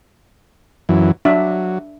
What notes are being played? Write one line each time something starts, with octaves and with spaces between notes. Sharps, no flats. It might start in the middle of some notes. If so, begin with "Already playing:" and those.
F#2 E3
F#3 D4 E5